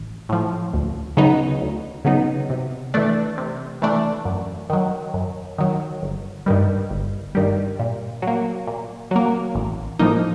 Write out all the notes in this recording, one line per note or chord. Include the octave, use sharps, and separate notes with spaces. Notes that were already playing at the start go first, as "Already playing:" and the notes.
Already playing: A1
A2 F3
D2
C#3 F#3 B3 D#4
D2
C#3 F#3 B3 D#4
C3
E3 A3 D4
C3
E3 A3 D4
F#2
D#3 F#3
F#2
D#3 F#3
G1
G2 D#3 G3
G1
G2 D#3 G3
A#2
F#3
A#3
A#2
F#3 A#3
A1
A2 F3 A#3 D#4